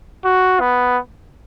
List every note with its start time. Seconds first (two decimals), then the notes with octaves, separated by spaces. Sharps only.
0.25 F#4
0.60 B3